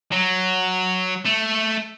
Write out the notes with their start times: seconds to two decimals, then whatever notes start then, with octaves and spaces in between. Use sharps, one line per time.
0.12 F#3
1.25 A3